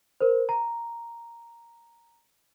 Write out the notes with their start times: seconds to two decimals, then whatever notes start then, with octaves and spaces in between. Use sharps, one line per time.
0.21 A#4 C5
0.49 A#5